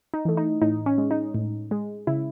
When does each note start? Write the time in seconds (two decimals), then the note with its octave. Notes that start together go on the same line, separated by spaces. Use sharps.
0.14 D#4
0.25 E3 A3
0.37 D#4
0.62 A2 D#4
0.86 C#4
0.98 G#3
1.11 D#4
1.35 A2
1.71 G#3
2.07 C#3 E4